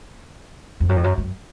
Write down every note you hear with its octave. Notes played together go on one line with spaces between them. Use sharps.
F2
F#2
F2
F#2
F#2